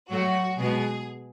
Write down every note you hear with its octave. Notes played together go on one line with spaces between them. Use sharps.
A2 F#3 A3 F#4
B2 G#3 B3 G#4